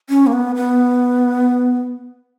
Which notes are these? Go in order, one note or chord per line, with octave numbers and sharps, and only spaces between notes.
C#4
A#3
B3
B3